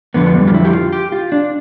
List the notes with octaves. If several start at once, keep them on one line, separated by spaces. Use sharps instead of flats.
F2 D3 F3 B3
G3
F4
E4
G4
F4
G4
F4
D4